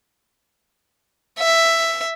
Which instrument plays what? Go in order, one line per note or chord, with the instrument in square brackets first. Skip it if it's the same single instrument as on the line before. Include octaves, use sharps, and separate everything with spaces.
[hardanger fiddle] E5